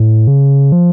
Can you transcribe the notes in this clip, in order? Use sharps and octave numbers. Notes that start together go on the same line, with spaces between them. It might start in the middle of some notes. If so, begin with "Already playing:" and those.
Already playing: A2
C#3
F3